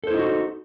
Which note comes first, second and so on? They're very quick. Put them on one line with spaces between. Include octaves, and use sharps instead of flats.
A4 C5 E4 D#4 F#4